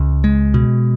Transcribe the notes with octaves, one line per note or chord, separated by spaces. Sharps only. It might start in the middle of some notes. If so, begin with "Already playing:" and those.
Already playing: C#2
G#3
B2